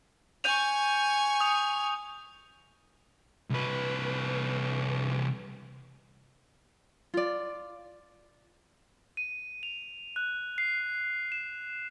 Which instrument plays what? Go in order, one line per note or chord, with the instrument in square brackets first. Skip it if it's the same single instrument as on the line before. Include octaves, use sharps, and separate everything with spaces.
[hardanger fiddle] G#5 C#6 [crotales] G6 D#7 F7
[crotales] D#6 F7
[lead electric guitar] C2 B4
[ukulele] F4 D5
[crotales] D#7
F7
F#6
C7
E7